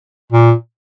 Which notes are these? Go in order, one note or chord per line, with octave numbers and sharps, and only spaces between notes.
A#2